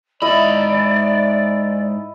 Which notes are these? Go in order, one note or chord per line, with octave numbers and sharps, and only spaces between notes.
G#2 E4 D5 D#5 B5